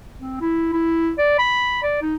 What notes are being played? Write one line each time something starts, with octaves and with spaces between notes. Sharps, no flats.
C4
E4
E4
D5
B5
D5
D#4